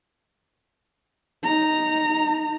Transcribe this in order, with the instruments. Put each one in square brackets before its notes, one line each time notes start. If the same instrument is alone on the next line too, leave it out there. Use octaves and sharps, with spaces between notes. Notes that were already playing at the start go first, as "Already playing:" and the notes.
[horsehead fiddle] D#4 A#5